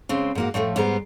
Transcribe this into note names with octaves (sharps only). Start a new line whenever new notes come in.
C#3 G#3 C4
G#2 A#3 F#4
A2 F3 F#3 A3
G#2 G3 B3 C5 A#5